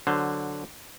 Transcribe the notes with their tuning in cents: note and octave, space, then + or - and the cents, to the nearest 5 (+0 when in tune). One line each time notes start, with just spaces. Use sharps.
D3 +0 F#3 +0 C5 -5